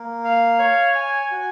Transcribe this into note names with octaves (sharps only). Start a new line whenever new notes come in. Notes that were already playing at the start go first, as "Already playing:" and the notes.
Already playing: A#3
F5
C#5
G#5
F#4